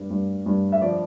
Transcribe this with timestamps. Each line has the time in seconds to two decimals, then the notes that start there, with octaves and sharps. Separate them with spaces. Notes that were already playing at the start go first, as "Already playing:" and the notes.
Already playing: G2
0.10 G2
0.46 G2
0.72 E5
0.81 F3 D5